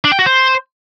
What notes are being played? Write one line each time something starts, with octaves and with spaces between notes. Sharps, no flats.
D4
G5
F#4
C5